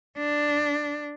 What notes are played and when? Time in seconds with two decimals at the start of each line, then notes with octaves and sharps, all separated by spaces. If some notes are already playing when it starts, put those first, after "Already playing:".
0.17 D4